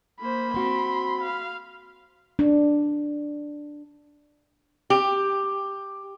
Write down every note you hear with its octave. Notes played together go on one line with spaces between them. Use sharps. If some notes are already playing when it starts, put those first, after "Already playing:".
A#3 C5 B5
C4 F#4 C6
F5
D4
G4